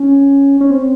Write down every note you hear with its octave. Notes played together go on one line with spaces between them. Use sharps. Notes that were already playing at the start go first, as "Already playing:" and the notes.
Already playing: C#4
C#4
C4